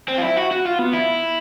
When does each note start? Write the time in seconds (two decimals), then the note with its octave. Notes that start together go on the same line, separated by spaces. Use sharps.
0.08 C4
0.18 F4
0.23 E4
0.37 F#4
0.51 F#4
0.65 F4
0.79 B3
0.93 E4